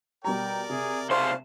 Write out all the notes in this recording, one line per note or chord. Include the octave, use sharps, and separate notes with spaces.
B2 G3 A#4 D5 G5 A#5
C3 G#4
C#2 G#4 C5 F5 A5